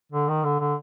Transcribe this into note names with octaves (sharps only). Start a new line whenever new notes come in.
D3
D#3
D3
D3